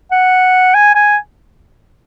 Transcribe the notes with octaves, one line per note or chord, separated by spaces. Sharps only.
F#5
G#5
G#5